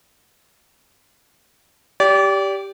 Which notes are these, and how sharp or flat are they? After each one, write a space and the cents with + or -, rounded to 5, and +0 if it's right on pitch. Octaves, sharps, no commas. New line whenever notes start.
G4 +0 D5 -30